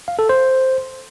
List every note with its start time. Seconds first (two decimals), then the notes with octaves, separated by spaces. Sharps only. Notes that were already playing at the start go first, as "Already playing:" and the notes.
0.08 F5
0.19 A4
0.29 C5